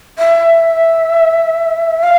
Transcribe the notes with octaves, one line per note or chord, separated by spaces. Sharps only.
E5
F5